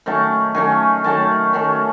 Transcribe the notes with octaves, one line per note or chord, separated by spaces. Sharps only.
D#3 F#3 A3 C#4 A5
D#3 F#3 A3 C#4 G#5
D#3 F#3 A3 C#4 A5
D#3 F#3 A3 C#4 A5